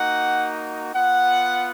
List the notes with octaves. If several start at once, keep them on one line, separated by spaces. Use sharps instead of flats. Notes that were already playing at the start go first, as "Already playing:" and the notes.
Already playing: A#3 D#4 F#4 F#5
B3 F4 F#5